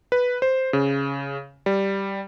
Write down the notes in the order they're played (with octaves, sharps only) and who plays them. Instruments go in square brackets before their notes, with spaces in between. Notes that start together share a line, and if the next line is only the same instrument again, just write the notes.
[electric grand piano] B4
C5
C#3
G3